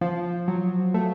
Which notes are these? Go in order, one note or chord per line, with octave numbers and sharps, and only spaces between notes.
F3
F#3
A3